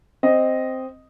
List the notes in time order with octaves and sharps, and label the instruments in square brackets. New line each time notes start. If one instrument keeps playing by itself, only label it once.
[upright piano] C4 D#5